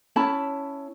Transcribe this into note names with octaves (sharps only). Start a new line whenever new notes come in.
C#4 E4 A5 B5